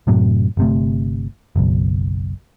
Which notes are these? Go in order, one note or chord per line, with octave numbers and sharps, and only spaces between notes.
F#2 A2 C3 F#3
G1 C3 A3
F#1 B1